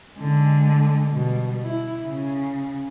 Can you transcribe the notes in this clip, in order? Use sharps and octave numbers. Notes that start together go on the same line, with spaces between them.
D3 G#3
B2 G3
E4
C#3